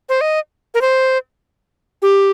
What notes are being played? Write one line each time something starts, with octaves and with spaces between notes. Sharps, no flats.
C5
D#5
A#4
C5
G4